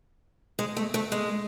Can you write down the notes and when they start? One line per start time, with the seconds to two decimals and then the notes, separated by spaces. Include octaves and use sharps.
0.59 G#3
0.77 A3
0.94 A3
1.12 G#3